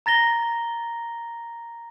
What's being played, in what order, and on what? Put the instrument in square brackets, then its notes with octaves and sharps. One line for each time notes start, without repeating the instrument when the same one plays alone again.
[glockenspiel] A#5 A6 A#6 G7